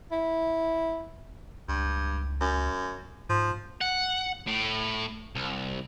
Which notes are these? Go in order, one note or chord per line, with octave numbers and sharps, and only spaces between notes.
E4
C#2 G2
F#2
G#2 F3
F#5
A2
C2